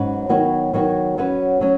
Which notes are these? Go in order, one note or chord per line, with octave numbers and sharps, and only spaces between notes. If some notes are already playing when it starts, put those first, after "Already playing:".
Already playing: G#2 F#3 C#4 B4
D#3 F#3 B3 F#4 C#5
D#3 F#3 B3 F#4 C#5
F#3 C#4 F#4 B4
F#3 C#4